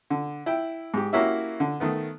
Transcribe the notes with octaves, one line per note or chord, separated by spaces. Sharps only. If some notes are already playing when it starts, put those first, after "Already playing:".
D3
E4 G5
G#2 G4
A#3 C#4 E4 F#4 G4 E5
D3
D#3 A3 B3